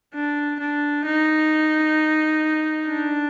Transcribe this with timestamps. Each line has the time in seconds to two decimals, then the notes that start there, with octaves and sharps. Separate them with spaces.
0.14 D4
0.60 D4
1.05 D#4
2.88 D4